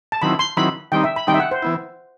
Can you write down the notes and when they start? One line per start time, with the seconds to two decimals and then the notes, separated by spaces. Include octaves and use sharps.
0.12 A5
0.22 D#3 F#3 C4 E4 B5
0.39 C6
0.57 D#3 F#3 C4 E4 B5
0.92 D#3 G3 C4 D#4 G5
1.04 E5
1.16 B5
1.27 D#3 G3 C4 D#4 G5
1.34 E5
1.40 F#5
1.51 C5
1.62 E3 B3 E4